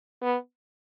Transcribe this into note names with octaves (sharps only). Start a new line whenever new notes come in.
B3